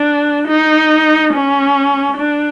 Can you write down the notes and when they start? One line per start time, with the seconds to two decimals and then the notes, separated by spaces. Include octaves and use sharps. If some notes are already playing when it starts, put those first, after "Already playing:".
Already playing: D4
0.48 D#4
1.33 C#4
2.17 D4